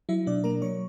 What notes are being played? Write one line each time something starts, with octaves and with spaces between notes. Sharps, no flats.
F#3 E4 E5
B2 D4 D5
A#3 A#4 A#5
F#3 C#5 C#6